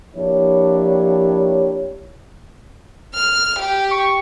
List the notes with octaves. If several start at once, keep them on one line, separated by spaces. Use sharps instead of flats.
F3 A#3 D4 E4 G4 C#5
F6
G4
C#6